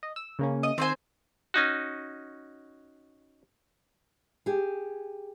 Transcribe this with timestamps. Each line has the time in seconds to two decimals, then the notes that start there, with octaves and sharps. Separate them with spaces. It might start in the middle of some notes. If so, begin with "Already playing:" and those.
0.03 D#5
0.16 E6
0.39 C#3 A#3 C#4
0.63 D#5
0.78 D#3 C4 C5 G#5 C6
1.54 C#4 D#4 F#4
4.46 G4 G#4